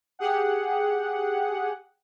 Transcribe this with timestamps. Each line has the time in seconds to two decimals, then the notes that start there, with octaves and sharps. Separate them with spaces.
0.19 G4 G#4 F#5